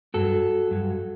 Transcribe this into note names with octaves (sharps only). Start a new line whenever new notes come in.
G2 F#3 F#4 A4
G2 F#3